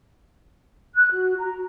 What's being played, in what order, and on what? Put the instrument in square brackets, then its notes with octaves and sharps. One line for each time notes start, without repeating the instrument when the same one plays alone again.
[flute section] F#6
F#4
A#5